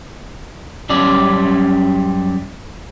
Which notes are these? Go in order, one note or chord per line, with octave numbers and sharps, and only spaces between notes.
F#2 G3 C#4 D5